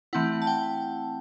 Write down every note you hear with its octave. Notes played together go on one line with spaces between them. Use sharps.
E3 A3 C4 E4 F#5
A5
G5